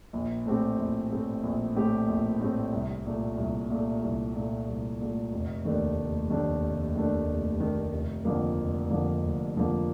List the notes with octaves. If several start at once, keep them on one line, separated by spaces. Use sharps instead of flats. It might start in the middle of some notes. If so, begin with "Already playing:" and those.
A#1
A2 A3 C4 G4
A#1
A2 A3 C4 G4
A#1
A2 A3 C4 G4
A#1
A2 A3 C4 G4
C2
A#2 A3
C2
A#2 A3
C2
A#2 A3
C2
A#2 A3
F1
D#2 D#3 A3 D4
F1
D#2 D#3 A3 D4
F1
D#2 D#3 A3 D4
F1
D#2 D#3 A3 D4
F1
F2 D3 F3 A#3
F1
F2 D3 F3 A#3
F1
F2 D3 F3 A#3